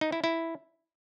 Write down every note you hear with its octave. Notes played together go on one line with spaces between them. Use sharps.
D#4
E4
E4